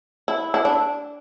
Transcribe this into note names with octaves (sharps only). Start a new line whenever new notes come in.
E4
E4
D4